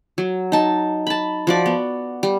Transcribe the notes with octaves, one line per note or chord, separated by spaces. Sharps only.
F#3
D#4 A5
A5 B5
F3 F#4 D5
B3
G3